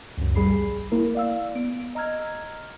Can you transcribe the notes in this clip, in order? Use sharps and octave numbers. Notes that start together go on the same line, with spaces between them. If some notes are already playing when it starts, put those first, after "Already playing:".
C#2 F#2
A#1 G3 G#4 B5 C7
A#3 E4 A#4
D5 F5 E6
B3 D7
D#5 A#5 E6 F6 G#6